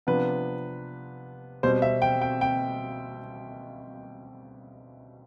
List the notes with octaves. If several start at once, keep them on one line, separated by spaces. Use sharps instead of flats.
C3 F3 B3 D4 B4
B2 G3 C4 C5
E5
G5
G5
G5